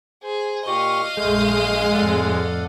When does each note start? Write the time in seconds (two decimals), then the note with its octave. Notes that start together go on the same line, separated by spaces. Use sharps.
0.23 G#4 C5
0.67 A#2 G4 D#5 F5 C#6
1.17 A#1 F#2 G#3 A3 G6
1.93 F2 A2 A4 D5 F#5